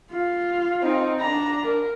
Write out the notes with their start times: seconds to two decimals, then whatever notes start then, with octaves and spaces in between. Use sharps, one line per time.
0.12 F4
0.82 C4 D#4
1.21 D4 A#5
1.64 A#4